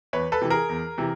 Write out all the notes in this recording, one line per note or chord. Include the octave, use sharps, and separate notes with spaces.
E2 B4 C#5
A4 B4
C3 E3
G#4 A#4
E2
C3 E3